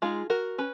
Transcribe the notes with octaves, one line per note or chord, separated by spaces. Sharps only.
G#3 D#4 F4 G#4
F#4 A#4
C#4 B4